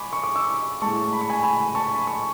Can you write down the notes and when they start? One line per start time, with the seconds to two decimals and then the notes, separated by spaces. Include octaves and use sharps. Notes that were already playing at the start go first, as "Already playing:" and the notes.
Already playing: G#3 G#5 B5 C#6 D6
0.13 C#6
0.24 D6
0.35 C#6 E6
0.82 A2 G#3 A5 C#6
1.13 B5
1.21 C#6
1.29 G#5 B5
1.44 G#5 B5
1.75 A5 C#6
1.95 B5
2.07 C#6